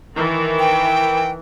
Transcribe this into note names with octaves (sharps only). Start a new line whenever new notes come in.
D#3 E3
G5